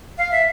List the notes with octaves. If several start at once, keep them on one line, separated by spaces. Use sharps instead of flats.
F5
E5